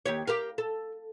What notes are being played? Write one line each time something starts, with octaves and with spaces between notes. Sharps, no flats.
D#2 G4 C#5
G4 A#4 F5
A4